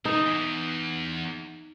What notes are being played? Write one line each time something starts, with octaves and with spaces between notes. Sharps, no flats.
E3 D#4
E2 E3